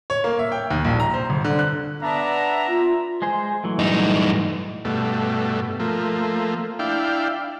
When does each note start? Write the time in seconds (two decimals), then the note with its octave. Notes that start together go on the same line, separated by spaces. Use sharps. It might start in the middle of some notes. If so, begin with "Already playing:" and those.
0.10 C#5
0.24 A#3
0.39 E5
0.52 G5
0.70 D#2
0.85 A#1
1.00 A#5
1.14 C5
1.30 G1
1.44 D3
1.59 F#6
2.02 B3 D4 E5 A#5
2.68 F4
3.22 G#3 G#4 C5
3.64 E3 F#3 A3
3.79 G2 D#4
4.85 G2 B2 A3
5.79 F3 A3 A#3
6.79 D4 E4 F5 G5